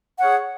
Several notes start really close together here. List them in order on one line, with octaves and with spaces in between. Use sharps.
F#5 C#5 G#4